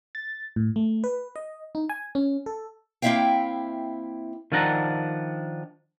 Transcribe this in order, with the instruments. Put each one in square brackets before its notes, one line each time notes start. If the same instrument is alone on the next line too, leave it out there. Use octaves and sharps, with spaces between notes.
[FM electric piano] A6
A2
A3
B4
D#5
D#4
G#5
C#4
A4
[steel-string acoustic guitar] A#3 C4 E4 E5 F5 G5
[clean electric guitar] D#3 F3 D4 F#5 A#5